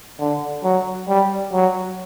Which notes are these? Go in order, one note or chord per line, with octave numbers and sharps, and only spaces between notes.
D3
F#3
G3
F#3